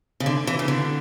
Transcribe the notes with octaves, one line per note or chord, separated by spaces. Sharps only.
C#3
D3
E3
C#3
D3